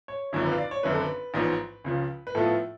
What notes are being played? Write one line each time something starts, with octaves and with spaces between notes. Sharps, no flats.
C#5
G#1 F#2 D3 F3 C#5
B4
F5
D5
C#5
G#1 F#2 D3 B4
A4
B4
A1 G#2 F3 B3
C#2 C#3 F3
B4
A2 F3 B3 F4 A4